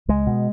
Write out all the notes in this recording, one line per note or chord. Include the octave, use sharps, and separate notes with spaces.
C#2 G#3
B2